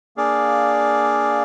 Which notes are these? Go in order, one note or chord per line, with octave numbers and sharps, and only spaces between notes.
A#3 D4 G#4 D5 F5